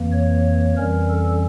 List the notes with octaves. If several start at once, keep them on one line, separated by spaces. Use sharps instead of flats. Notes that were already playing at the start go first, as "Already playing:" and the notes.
Already playing: F2 E3 A#3
C#5
F2 E3 G3 C#4 A#4
A4